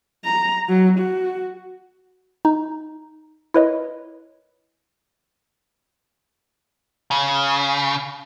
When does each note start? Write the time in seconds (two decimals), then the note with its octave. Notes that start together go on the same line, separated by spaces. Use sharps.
0.25 A#5
0.68 F#3
0.98 F#4
2.45 D#4
3.54 E4 A#4 B4 C#5 D#5
7.11 C#3